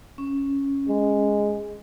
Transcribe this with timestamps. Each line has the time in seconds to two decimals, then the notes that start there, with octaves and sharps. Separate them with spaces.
0.18 C#4
0.89 G#3